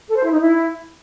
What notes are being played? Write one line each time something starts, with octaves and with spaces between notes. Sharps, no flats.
A4
C5
E4
D#4
E4